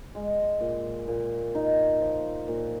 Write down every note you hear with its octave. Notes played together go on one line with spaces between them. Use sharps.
G#3
A#2
A#2
D#4
F3
A#2